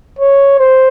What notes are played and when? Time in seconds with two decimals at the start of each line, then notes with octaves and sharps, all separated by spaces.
0.19 C#5
0.59 C5